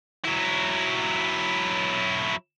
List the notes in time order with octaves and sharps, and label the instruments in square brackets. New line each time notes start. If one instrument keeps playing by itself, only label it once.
[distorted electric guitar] F#3 E4